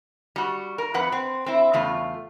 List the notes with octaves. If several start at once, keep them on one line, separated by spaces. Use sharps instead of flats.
G3 F#4
A#4
F2 B4 F#5
C4
C4 E4
E2 C#3 A3 F4